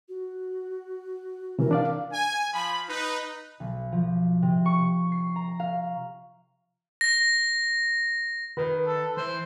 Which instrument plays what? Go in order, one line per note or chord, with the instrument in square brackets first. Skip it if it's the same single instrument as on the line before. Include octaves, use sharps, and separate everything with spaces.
[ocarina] F#4
[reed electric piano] C3 E3 [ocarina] A#4
[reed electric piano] D4 D5 F5
[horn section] G#5
F3 B5
D#4 B4
[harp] B1
F3
C3
C#6
C7
A#5
F5
[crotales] A#6
[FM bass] D#3 [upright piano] B4
[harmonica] A4
[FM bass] E3 [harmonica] C5